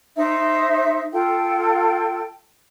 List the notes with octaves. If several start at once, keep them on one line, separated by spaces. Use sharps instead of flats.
D#4 C5 E5
F4 A4 G5